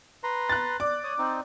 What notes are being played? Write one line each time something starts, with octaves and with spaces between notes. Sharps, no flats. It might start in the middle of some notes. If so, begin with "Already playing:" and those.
B4 A#5 C6
F#6 A6
D5 D6
C#5 D#6
C4 D#4